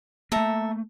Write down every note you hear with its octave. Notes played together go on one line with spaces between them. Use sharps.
A3 A#3 A4 E5 A#5